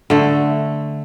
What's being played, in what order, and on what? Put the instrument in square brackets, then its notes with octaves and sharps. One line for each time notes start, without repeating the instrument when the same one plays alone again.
[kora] D3 A3